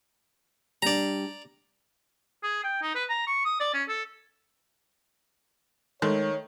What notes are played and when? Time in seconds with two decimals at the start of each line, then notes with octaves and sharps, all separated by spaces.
0.82 G3 D4 D5 A#5
2.43 G#4
2.64 G5
2.82 D#4
2.95 B4
3.09 A#5
3.27 C#6
3.45 D#6
3.60 D5
3.74 C#4
3.89 A4
6.02 D#3 G#3 A3 C#5